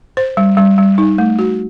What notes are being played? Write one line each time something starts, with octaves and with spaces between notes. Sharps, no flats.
C5
G3
G3
G3
D#4
A3
F#4